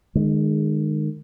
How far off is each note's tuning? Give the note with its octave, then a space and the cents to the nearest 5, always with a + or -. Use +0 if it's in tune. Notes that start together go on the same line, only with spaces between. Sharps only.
D#3 -35 G#3 +0